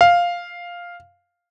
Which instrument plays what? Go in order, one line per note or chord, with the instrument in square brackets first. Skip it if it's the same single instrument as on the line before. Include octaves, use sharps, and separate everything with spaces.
[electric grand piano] F5